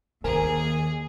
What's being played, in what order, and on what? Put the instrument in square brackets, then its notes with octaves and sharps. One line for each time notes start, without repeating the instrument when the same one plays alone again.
[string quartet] D#2 [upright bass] D#3 [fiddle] G#4 [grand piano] A#4 C5 G#5